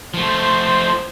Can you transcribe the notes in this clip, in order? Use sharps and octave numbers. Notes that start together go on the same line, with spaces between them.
F3 A3 C5